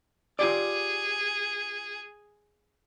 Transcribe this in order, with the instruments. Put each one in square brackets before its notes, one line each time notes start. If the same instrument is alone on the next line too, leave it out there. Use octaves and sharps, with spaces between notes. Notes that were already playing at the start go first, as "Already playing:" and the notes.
[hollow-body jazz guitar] F4 G4 D5 [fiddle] G#4